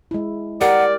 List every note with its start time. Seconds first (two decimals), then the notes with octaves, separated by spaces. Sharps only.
0.11 G#3 E4
0.61 G4 A#4 D5 F#5